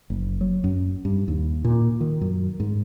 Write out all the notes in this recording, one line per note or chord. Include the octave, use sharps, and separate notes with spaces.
F#1
F#3
F#2
G2
D#2
A#2
D#3
F#2
G#2